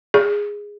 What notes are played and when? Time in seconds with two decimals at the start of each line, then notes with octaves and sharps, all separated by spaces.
0.14 G#4